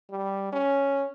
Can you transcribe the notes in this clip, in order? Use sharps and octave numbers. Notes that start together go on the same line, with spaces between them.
G3
C#4